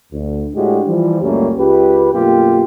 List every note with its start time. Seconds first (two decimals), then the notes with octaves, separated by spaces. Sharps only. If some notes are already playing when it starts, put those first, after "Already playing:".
0.13 D2
0.55 A2 G#3 D4 F#4 G4
0.86 E3 F3 G3
1.22 C#2 F#2 G3 A3 A#3 C#4
1.58 C#2 G4 B4
2.13 F#2 B2 A3 A#3 F4 G4